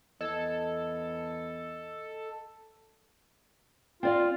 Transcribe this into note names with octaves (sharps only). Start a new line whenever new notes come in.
E2 A4 D#5 G#6
C4 F4 D5 F5